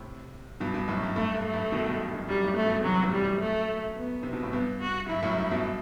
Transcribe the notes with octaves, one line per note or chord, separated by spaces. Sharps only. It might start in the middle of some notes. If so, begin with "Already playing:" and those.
Already playing: A2 C3
G2 B2
G2 B2
F#2 A2
G2
G2 A3
G2
A3
G2
B2 D#3
G2 B2
G2
F#2
F#2 G3
A2
G2
A3
G2 B2
C3 E3 F#3
A2 C3
G3
F#2
A3
B3
C3
B2
A2
G2 B3
F#4
G2 E4
F#2 A2
G2
G2 B2